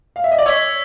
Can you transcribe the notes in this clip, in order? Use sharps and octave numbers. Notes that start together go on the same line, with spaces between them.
F5
E5
D#5
D5
C#5 E6 G#6 B6